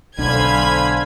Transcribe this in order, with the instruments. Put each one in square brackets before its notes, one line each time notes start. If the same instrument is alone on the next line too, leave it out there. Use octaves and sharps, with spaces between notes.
[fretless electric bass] B1 D4 [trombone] D3 [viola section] C5 F5 G#5 [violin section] B5 G#6